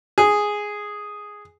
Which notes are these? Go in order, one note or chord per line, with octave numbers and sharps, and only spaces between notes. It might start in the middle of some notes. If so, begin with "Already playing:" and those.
G#4